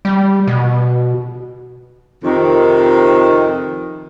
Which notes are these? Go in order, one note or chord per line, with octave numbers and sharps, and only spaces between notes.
G3
B2
F2 C3 D#3